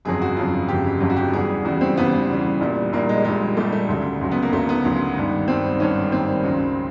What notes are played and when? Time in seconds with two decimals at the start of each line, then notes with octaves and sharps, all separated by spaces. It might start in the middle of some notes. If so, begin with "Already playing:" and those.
0.05 G1 F2 C#3 F#3 G#4
0.22 F#4
0.37 G1 F2 C#3 F#3 F4
0.68 G1 F2 C#3 F#3 G4
1.01 G1 F2 C#3 F#3
1.10 F#4
1.16 G4
1.33 E2 C#3 E3 G3 G#4
1.65 E2 C#3 E3 G3 F#4
1.81 C4
1.97 E2 C#3 E3 G3 B3
2.13 B3
2.29 E2 C#3 E3 G3
2.61 A#1 A#2 G3
2.93 A#1 A#2 G3 A#3
3.09 G#3
3.24 A#1 A#2 G3 G#3
3.57 A#1 A#2 G3 A3
3.72 A3
3.89 D2 C#3 F#3
4.21 D2 C#3 F#3
4.31 B3
4.42 A#3
4.52 D2 C#3 F#3 A3
4.69 B3
4.85 D2 C#3 F#3
5.17 G#1 G2 D#3
5.48 G#1 G2 D#3 C4
5.80 G#1 G2 D#3 C#4
6.12 G#1 G2 D#3 C4
6.44 C#2 C#3 F#3